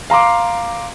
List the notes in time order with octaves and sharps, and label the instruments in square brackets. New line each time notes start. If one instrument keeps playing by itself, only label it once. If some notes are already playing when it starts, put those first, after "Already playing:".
[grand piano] F5 A#5 C6 D6